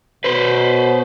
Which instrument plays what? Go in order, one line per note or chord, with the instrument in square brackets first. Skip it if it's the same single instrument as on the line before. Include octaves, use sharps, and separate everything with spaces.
[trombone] B2 [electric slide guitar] B4 C5